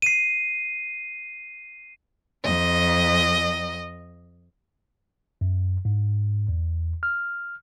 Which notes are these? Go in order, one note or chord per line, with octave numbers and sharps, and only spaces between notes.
C7 D#7
F2 D#5
F#2
G#2
E2
F6